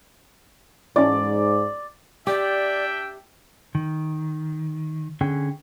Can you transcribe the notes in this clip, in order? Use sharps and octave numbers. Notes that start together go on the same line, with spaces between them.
G#2 E3 C#4 D5
D4 G4 D5 E5 G5
D#3
D3 C#4 G#4 G5